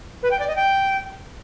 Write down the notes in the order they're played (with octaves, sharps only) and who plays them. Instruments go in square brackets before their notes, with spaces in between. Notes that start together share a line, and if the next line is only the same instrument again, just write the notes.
[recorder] B4
G5
D5
D#5
G5